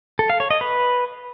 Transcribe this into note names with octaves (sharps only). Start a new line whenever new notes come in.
A4
F5
C#5
D#5
B4